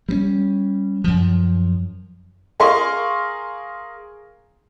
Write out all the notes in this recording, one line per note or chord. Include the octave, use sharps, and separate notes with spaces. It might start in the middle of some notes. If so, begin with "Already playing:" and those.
G3 B3 C#4
F#2 F3
G#4 A#4 F5 C6 C#6